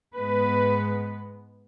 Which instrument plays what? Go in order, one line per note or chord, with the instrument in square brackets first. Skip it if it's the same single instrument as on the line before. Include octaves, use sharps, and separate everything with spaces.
[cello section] G#2 G#3 B3 B4